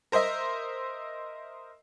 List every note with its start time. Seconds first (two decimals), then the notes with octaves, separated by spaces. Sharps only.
0.12 A#4 C5 D#5 E5